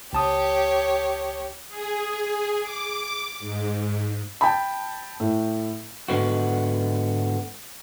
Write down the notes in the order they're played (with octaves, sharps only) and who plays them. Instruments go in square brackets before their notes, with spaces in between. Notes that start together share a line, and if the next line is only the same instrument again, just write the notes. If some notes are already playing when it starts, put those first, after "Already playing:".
[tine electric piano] C#2 A5 D#6 [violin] G4 C#5
[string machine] G#4
D6
G#2
[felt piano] G5 A5 B5
A2
[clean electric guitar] G#2 D3 B3 F#4